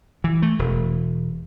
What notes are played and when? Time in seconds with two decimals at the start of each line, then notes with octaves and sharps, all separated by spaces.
0.24 E3
0.42 A3
0.59 E1